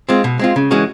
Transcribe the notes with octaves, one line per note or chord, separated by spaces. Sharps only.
G#3 C4 F4
B2
G#3 C4 F4
C#3
E3 G#3 C#4 F#4